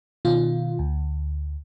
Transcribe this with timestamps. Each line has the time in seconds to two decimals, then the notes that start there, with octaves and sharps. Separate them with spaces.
0.25 B2 D#3 F4
0.79 D2